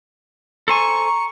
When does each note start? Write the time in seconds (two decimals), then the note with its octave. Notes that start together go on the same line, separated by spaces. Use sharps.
0.68 A4 C5 G#5 A#5 C#6